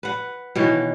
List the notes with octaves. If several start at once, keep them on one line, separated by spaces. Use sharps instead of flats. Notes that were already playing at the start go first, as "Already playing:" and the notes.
B4 F#5
B2 D#3 E3 C#5